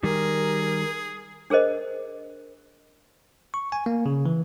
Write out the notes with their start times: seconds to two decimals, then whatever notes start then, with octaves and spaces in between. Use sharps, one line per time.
0.03 D#3 G3 G#4 A#4
1.50 D4 G#4 A#4 C5 D#5
3.54 C#6
3.72 G#5
3.86 A#3
4.06 C#3
4.26 E3